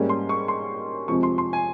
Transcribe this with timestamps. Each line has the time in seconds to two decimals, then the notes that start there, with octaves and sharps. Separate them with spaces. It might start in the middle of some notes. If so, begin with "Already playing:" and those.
Already playing: G#2 G3 A#3 C#4
0.09 C6
0.29 C#6
0.48 C6
1.08 F2 C3 F3 G#3 C#6
1.23 C6
1.38 C6
1.53 G#5